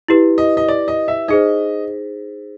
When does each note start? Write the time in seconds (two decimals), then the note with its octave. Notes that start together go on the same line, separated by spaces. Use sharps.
0.08 E4 G4 B4
0.38 D#5
0.57 D#5
0.68 D5
0.88 D#5
1.08 E5
1.28 D#4 G#4 C5 D#5